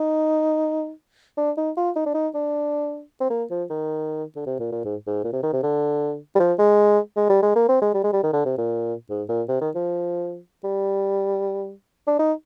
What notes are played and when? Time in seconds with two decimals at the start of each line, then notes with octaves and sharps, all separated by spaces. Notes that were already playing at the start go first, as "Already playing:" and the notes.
Already playing: D#4
1.38 D4
1.57 D#4
1.77 F4
1.96 D#4
2.06 D4
2.14 D#4
2.34 D4
3.20 C4
3.30 A#3
3.51 F3
3.70 D#3
4.36 D3
4.46 C3
4.60 A#2
4.72 A#2
4.85 G#2
5.07 G#2
5.24 A#2
5.33 C3
5.43 D#3
5.53 C3
5.63 D3
6.35 G3
6.40 F3
6.59 G#3
7.17 G#3
7.29 G3
7.42 G#3
7.56 A#3
7.69 C4
7.82 G#3
7.94 G3
8.04 G#3
8.13 G3
8.24 D#3
8.33 D3
8.45 C3
8.58 A#2
9.10 G#2
9.29 A#2
9.49 C3
9.61 D#3
9.75 F3
10.64 G3
12.07 D4
12.19 D#4